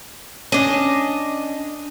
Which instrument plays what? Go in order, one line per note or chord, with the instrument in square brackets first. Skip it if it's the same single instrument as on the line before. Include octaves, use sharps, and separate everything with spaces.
[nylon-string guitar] C#4 [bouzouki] D4 D#5